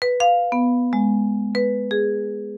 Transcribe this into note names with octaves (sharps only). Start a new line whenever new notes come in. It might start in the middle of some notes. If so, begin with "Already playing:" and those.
B4
F5
B3
G#3
B4
G#4